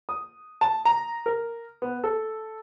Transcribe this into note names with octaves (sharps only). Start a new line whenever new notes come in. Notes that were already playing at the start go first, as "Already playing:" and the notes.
D#6
A5
A#5
A#4
B3
A4